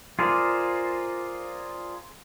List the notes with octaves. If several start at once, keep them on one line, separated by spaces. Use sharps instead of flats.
F4 G#4 A#4 C5 D5